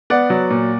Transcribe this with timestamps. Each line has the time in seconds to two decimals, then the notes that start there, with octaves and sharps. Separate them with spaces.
0.10 B3 D5 F#5
0.30 F#3
0.50 A#2